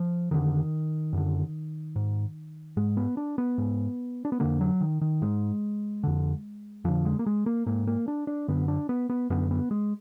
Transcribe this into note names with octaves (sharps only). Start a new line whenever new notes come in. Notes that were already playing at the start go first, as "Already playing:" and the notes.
Already playing: F3
F2 D3 D#3
F#2 D3
G#2
G#2 G#3
B3
D4
B3
G#2
D4
B3
F2 D3 A#3
F#3
D#3
D#3
G#2 G#3
F2 D3
F2 D3 F3
G#3
A#3
G#3
A#3
G#2 A#3
A#3
D4
D4
F#2 D3 B3
D4
B3
B3
F#2 D3 B3
B3
G#3